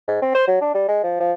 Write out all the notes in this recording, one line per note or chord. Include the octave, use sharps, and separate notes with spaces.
G#2
C4
C5
F#3
D4
G3
G#3
F3
F3